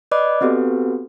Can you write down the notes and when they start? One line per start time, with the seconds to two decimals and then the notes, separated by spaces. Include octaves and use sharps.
0.11 B4 D5 D#5 B5 D6 F#6
0.41 B3 C4 F#4 G4 A4 B4